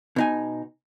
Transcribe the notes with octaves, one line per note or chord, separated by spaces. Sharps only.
B2 D#4 G#5